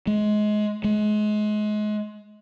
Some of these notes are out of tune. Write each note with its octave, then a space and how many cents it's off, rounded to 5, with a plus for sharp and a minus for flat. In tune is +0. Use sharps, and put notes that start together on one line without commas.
G#3 +25
G#3 +30